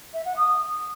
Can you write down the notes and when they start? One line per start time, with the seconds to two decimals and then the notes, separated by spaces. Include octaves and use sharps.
0.14 E5
0.25 F#5
0.37 D#6